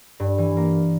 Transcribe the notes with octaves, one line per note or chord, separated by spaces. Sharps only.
G2
E3
A#3